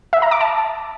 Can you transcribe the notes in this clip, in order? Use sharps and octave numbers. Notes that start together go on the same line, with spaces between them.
E5
A#5
D6
A5